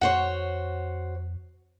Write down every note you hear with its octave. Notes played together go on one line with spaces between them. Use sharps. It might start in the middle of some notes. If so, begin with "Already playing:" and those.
F2 F#4 C5 C#5 F#5